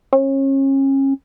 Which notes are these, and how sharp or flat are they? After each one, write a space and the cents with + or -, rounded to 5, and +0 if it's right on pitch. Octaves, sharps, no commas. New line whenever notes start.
C#4 -30